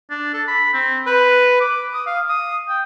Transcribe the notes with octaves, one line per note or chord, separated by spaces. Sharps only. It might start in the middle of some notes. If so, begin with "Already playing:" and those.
D4
A4
B5
C4
B4
D6
D#6
F5
D#6
G5